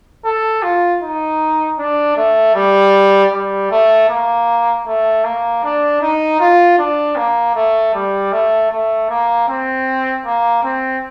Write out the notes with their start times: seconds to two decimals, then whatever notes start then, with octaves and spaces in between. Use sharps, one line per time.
0.25 A4
0.63 F4
1.02 D#4
1.78 D4
2.17 A3
2.55 G3
3.32 G3
3.71 A3
4.09 A#3
4.87 A3
5.24 A#3
5.63 D4
6.02 D#4
6.40 F4
6.78 D4
7.16 A#3
7.55 A3
7.94 G3
8.32 A3
8.71 A3
9.09 A#3
9.48 C4
10.25 A#3
10.63 C4